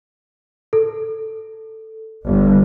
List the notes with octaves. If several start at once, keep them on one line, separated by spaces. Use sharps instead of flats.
A4
G1